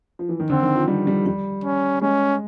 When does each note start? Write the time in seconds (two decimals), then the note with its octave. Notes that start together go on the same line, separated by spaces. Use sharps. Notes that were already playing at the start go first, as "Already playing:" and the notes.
0.19 F3
0.29 E3
0.40 D#3
0.50 D3 C4
0.62 D#3
0.75 F3
0.88 G3
1.07 G3
1.26 G3
1.64 C#4
2.01 G#3 C#4